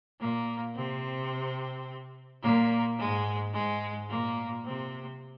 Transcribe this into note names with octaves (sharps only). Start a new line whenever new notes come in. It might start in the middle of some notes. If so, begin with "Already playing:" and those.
A#2 A#3
C3 C4
A#2 A#3
G#2 G#3
G#2 G#3
A#2 A#3
C3 C4